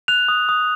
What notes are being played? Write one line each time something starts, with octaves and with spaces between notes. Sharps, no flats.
F#6 F7
D#6
D#6